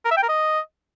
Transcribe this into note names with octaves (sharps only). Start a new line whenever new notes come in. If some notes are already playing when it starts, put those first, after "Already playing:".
A#4
E5
G5
A#4
D#5